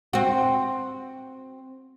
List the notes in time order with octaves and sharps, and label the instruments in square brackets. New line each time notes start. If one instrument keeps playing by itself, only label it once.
[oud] C4 F#4